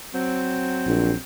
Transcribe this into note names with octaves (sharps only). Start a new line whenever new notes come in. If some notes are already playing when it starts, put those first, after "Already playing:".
F#3 C4
A#1